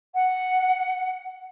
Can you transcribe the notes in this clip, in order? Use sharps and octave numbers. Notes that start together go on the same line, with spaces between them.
F#5